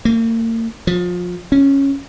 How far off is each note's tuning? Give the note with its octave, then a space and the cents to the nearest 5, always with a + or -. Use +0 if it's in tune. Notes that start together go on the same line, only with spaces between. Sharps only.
A#3 -40
F3 +30
C#4 -5